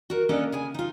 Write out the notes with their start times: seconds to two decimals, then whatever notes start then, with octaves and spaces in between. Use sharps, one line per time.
0.10 F#4 A#4
0.29 A#3 B3 C#4 D4 A4 D#5
0.52 C#3 G#4 G#5
0.74 D#4 F4